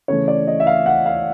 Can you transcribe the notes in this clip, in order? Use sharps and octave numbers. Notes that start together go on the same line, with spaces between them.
C#3 E3 A3 C#5
D5
D#5
E5
F5
F#5
F5